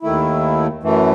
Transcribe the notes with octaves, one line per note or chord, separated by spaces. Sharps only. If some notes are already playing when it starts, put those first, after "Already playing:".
D#2 D#3 A3 E4
F#2 E3 A3